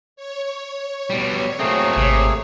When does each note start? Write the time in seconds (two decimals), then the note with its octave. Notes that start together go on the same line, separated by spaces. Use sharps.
0.16 C#5
1.10 B2 G3
1.59 F#3 A3 A#3 C4 G#4
1.96 G#1 C3